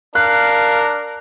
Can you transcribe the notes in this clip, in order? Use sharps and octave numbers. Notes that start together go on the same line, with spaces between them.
D4 A#4 F5 F#6